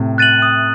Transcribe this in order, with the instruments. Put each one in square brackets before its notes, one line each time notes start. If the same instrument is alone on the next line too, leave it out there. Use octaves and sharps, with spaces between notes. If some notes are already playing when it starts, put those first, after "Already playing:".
Already playing: [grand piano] A2 C3
[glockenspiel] F#6 A6 D#7 F#7
D#6